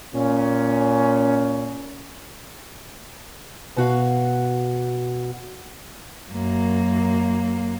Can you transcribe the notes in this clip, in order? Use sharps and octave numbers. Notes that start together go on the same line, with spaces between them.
A#2 C#4
B2 F#4 F5
F#2 A#3